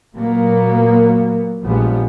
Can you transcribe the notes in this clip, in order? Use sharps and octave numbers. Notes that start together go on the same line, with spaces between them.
A#2 F#3 A#3 B3
A#1 F3 G3 G#3 B3